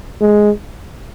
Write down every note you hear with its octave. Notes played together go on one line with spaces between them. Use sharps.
G#3